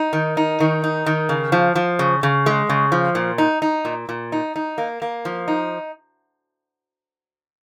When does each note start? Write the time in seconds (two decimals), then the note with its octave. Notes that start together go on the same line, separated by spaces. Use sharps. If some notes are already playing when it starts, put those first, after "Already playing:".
Already playing: D#4
0.13 D#3
0.37 D#4
0.60 D#3
0.84 D#4
1.06 D#3
1.29 C#3
1.52 F3
1.75 F3
1.99 C#3
2.23 C#3
2.46 G#3
2.69 C#3
2.92 F3
3.15 A#2
3.38 D#4
3.62 D#4
3.85 A#2
4.09 A#2
4.32 D#4
4.56 D#4
4.78 A#3
5.02 A#3
5.25 F3
5.48 D#4